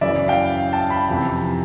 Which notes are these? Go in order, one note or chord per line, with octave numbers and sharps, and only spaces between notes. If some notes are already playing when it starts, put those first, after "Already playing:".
F#2 C#3 E3 D5 E5
F5 G5
G5 A5
A5 B5
F2 C3 E3